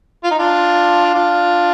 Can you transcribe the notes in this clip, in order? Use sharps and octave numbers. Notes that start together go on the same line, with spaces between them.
F4
D#4
D4 F4
D4 F4